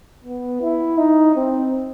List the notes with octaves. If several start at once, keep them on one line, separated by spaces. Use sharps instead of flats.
B3
E4
D#4
C4